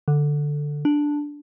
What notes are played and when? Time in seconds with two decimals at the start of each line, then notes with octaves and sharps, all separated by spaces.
0.08 D3
0.85 D4